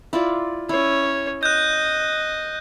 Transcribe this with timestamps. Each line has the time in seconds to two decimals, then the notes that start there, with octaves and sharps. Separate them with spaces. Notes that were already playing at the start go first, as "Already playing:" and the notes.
0.13 E4 F4 D5
0.69 C#4 E4 C#5
1.43 D#5 F#6 G6